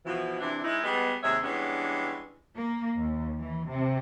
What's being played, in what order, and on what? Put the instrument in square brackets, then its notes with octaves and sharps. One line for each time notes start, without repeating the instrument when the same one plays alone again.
[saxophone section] B2 E3 F3
C3 E3 D4
G#3 C#4 D#4 E4
G3 G#3 B3
D#2 C3 G#3 C#5 E5
E3 G3 G#3 B3 C#4 D4
[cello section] A#3
D#2
E3
C3